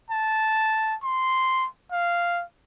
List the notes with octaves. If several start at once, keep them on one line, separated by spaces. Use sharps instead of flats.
A5
C6
F5